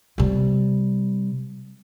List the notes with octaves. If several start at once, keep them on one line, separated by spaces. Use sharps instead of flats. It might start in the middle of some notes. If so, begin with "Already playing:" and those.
C3 G3